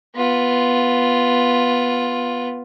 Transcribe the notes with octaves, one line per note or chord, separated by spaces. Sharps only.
B3 F4